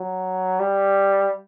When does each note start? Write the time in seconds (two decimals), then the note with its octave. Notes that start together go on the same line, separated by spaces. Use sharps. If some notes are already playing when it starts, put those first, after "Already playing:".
Already playing: F#3
0.60 G3